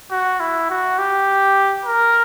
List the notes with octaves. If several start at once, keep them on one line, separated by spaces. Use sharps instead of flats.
F#4
E4
F#4
G4
A#4